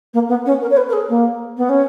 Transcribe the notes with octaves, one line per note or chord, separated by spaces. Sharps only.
A#3
B3
C#4
A#4
C#5
B4
A#4
G#4
A#3
B3
C#4